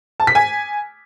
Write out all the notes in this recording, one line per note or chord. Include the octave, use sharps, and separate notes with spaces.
A5
B6
G#5